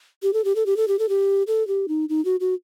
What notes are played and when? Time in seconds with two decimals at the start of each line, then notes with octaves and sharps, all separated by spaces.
0.23 G4
0.33 A4
0.44 G4
0.55 A4
0.66 G4
0.77 A4
0.88 G4
0.99 A4
1.09 G4
1.47 A4
1.68 G4
1.88 D#4
2.09 D#4
2.25 F#4
2.40 F#4